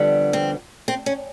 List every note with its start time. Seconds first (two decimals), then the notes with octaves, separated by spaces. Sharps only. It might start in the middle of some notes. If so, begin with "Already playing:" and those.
Already playing: F2 D3 G3 B3
0.33 C4
0.88 C4
1.06 C#4